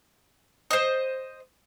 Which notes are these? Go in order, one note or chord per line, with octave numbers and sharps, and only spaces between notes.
C5 D#5